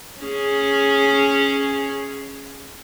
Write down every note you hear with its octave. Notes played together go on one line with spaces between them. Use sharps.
C#4 G#4